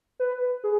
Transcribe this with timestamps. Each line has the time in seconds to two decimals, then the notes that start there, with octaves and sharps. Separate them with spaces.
0.20 B4
0.64 G#4